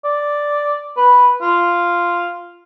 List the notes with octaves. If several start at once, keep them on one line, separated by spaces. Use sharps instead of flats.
D5
B4
F4